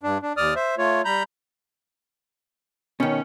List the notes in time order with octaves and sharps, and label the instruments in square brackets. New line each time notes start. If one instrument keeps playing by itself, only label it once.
[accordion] G2 D4
D4
D#2 D5 D#6 F6
C5 E5
A3 F4 C#5
G3 A#5 B5 G6
[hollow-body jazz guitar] B2 D#3 [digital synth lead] C#4